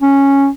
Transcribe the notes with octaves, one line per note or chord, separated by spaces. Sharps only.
C#4